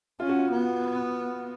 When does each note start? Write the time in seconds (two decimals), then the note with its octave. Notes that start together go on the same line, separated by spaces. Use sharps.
0.20 C#4 F4
0.29 F#4
0.39 F4
0.51 B3